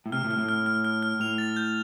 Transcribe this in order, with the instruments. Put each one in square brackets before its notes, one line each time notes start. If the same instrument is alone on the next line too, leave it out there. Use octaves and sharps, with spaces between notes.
[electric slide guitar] A2
[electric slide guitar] C3 [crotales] F6
[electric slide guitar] A2
[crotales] F6
[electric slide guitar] A2
[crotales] F6
F6
F6
F6
[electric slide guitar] A2 [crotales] F7
[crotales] A6
G6